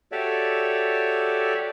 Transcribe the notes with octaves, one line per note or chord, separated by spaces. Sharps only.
F#4 G4 A4 C#5 D5 E5